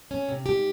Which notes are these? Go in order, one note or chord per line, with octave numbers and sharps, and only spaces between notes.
C#4
C3
G#2 G4